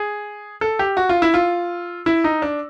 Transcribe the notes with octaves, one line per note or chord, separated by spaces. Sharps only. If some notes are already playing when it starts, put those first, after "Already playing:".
Already playing: G#4
A4
G4
F#4
F4
E4
F4
E4
D#4
D4